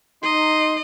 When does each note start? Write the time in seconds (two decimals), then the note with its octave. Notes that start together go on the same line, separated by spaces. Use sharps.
0.23 D#4 D#5 C6